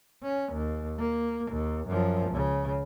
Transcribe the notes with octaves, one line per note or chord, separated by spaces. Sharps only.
C#4
D#2
A#3
D#2
F#2 F3
C#2 C#3